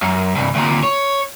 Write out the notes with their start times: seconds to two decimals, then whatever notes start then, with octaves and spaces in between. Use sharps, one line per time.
0.02 F#2
0.35 C2 G2
0.55 D2 A#2
0.83 C#5